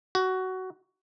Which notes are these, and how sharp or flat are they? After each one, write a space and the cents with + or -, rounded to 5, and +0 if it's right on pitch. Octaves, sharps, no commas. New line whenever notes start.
F#4 +15